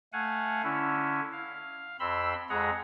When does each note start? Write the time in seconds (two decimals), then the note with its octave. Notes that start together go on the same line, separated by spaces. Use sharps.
0.13 A3 F5 F#5 G#5
0.63 D3 C#4 E4
1.32 F5
2.00 F2 C4 B5 C6 E6
2.50 F2 G#3 G#4 F#5 A#5